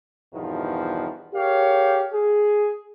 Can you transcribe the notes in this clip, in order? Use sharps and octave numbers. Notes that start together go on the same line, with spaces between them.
E2 G2 B2 D#3 F3
G4 G#4 A#4 C#5 F5
G#4